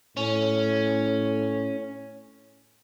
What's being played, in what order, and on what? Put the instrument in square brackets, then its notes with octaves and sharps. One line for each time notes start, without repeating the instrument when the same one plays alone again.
[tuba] A2 [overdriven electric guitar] C#4